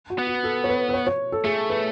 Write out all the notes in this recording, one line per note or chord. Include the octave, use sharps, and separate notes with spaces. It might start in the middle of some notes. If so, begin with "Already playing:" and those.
F#4
B3
F#4
A4
C#5
B4
B4
C#5
C#5
A4
A3 G#4
B4